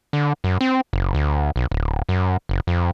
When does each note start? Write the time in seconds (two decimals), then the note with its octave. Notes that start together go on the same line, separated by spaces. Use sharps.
0.13 D3
0.44 F#2
0.61 C4
0.93 F#1
1.14 D2
1.56 B1
1.71 D1
2.09 F#2
2.49 F#1
2.67 F2